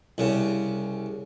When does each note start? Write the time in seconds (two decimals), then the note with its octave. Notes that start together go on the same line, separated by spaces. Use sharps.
0.18 C2 C#3